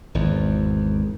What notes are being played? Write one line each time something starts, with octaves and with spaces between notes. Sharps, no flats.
G#1 E2